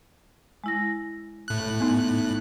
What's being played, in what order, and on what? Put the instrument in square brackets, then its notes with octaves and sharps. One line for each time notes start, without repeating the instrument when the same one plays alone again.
[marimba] G#3 E4 A#6
[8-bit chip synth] A2 F#6
[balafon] B3 D#4